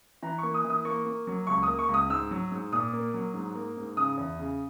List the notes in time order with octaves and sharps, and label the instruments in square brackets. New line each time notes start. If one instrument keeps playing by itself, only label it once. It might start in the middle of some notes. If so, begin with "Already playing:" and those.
[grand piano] E3 A#5
A#3 C#6
D#6
E3
D#6
A#3 C#6
A#3
F#3
C#2 C#6
A#3 D#6
C#6
C#2
D#6
G#2 E6
F#3
G#2
A#2 D#6
A#3
F#3
G#2
A#3
G#2
C#3 D#6
E2
C#3